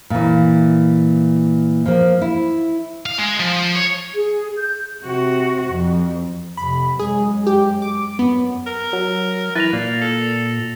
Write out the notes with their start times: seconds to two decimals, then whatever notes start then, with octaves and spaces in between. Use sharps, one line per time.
0.10 A#2 E3
1.86 F3 A#3
2.21 E4
3.06 F5
3.18 G#3
3.40 F3
3.76 C#5
4.16 G#4
4.56 G6
5.04 C3 F#4
5.68 F2
6.57 F2 C3 B5
6.99 F#2 G#3 G#4
7.47 G4
7.82 D6
8.19 F#2 B3
8.67 A#4
8.93 F#3
9.55 E3 B4 A6 A#6 F7
9.73 A#2 A#3
10.01 A4